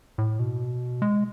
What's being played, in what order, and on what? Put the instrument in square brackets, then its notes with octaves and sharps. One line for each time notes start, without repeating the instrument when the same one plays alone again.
[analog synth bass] A2
B2
G#3